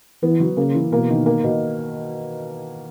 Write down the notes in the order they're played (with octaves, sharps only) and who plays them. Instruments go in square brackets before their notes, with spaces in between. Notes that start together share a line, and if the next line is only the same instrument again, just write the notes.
[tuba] E3 [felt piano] B3
[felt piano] F#3
[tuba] C#3 [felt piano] A#3
[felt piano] E3
[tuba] B2 [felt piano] A#3
[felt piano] D#3
A#3
B2